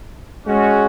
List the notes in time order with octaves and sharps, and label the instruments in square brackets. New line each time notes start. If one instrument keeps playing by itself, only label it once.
[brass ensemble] G#3 C#4 F#4